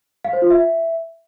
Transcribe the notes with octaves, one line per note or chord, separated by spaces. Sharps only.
F5
C5
F4
E5